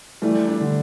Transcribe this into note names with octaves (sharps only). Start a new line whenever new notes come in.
E3 G3 A3
D4
D3